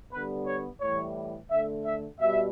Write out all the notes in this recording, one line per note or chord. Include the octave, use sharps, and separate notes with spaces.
D3 G3 B3 B4
C#5
A2 E3 G3 C#5
D3 A3 E5
E5
B2 G3 E5